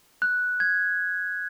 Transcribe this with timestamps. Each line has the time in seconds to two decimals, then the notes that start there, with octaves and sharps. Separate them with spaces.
0.22 F#6
0.60 G#6